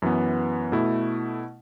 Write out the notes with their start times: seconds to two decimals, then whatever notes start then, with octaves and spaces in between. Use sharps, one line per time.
0.02 F#2 E3 B3
0.72 B2 A3 E4